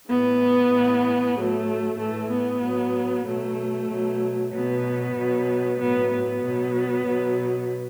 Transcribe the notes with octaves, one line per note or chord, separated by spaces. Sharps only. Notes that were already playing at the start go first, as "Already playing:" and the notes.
A2 E3 B3
A2 E3
A2 F#3 A3
A2 E3 A3
B3
A2 F#3
B2 F#3 A3
B2 F#3
B2 F#3 B3
B2 F#3
A2 F#3 B3
B3
B2 F#3
B2 F#3